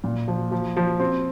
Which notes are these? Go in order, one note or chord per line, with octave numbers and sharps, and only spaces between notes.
A#2
F3
F3
F3
C4